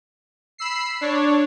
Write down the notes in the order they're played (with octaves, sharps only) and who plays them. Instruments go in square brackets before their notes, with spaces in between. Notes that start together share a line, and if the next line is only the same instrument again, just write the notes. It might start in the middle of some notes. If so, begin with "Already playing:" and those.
[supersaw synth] B5 E6 C7
D4 C#5